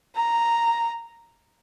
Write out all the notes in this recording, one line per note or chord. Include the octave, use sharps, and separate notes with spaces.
A#5